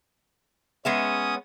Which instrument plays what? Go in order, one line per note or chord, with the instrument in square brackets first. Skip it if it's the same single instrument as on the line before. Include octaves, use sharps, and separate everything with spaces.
[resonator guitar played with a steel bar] G#3 B3 E5 [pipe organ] C#4 D#6